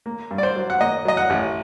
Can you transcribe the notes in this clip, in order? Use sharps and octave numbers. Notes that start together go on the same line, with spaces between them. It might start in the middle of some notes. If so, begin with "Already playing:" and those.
A#3
G2
D5
C5
F#3
F#5
A#3 D#5
F#3 D#5
F#5
A1